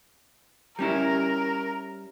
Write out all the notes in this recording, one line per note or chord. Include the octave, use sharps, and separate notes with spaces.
G3 C#4 E4 A#4